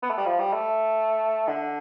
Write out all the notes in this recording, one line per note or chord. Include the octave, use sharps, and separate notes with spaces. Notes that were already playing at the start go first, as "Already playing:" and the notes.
B3
A3
G3
F3
G3
A3
D3